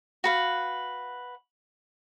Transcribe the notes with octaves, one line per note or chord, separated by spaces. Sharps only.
F#4 B4 F5